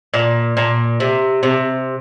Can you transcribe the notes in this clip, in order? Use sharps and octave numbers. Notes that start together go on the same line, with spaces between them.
A#2
A#2
C3
C3